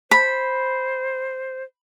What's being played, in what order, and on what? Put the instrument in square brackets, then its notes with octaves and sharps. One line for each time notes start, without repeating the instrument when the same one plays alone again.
[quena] C5 [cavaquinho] B5